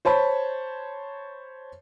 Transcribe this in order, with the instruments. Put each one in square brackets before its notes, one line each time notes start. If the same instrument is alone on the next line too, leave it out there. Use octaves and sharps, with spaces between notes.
[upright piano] C5 C#5 A5 B5